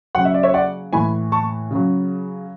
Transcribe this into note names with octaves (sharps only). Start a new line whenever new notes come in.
C#3 F#3 F#5
E5
D5
C#5 E5
D5 F#5
A2 E3 G#5 B5
A5 C#6
C#3 F#3